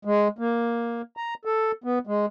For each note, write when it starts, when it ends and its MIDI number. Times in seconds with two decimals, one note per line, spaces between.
0.05 0.28 56
0.39 1.02 58
1.17 1.34 82
1.45 1.72 69
1.84 1.99 59
2.07 2.26 56